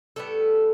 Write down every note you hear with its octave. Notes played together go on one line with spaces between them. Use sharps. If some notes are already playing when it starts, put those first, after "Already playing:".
A2 G3 B3 A4